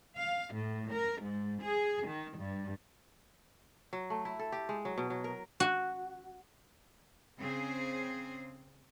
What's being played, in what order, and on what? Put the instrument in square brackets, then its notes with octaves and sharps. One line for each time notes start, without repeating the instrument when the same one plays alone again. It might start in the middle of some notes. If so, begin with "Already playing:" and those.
[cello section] F5
A2
A#4
G#2
G#4
D#3
G2
[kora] F#3
A3
E4
A4
G4
G#3
F#3
B2
F#3
A#4
[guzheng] F#4
[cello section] C#3 C4 G#4 C5